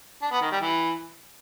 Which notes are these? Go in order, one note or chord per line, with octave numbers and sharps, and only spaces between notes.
D4
B3
D#3
G3
E3